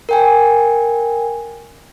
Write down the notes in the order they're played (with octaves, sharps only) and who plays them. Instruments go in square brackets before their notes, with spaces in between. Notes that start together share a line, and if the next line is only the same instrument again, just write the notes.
[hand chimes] A#4 G5 G#5